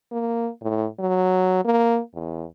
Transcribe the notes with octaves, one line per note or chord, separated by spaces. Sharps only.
A#3
A2
F#3
A#3
E2